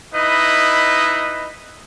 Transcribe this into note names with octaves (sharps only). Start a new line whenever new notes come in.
D#4 E4 B4 D#5